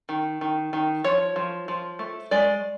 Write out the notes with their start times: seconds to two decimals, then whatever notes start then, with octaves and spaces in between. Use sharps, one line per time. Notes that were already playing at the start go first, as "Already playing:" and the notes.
0.09 D#3
0.41 D#3
0.73 D#3
1.04 F3 C#5
1.36 F3
1.68 F3
1.99 A3
2.31 G#3 D5